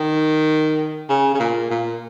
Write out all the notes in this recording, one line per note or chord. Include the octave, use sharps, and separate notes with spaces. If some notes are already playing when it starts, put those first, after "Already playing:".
Already playing: D#3
C#3
C#3
A#2
A#2